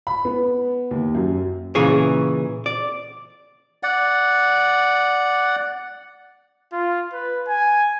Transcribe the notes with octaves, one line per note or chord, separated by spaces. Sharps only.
B5
B3
D#2
F#2
A#2 C#3 E3 G#4 C#5
D5
D5 F#5
F4
B4
G#5